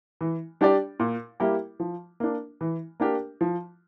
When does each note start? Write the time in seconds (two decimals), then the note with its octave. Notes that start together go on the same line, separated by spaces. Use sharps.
0.21 E3
0.61 G3 D4 G4 D5
1.00 A#2
1.40 G3 A#3 E4 G4
1.80 F3
2.20 A#3 D4
2.61 E3
3.00 A#3 D4 G4 A#4
3.41 F3